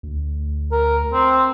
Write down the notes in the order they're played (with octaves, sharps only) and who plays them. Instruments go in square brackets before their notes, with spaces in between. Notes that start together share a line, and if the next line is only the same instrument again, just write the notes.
[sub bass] D2
[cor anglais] A#4
C4